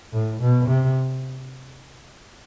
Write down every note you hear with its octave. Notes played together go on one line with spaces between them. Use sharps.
A2
B2
C3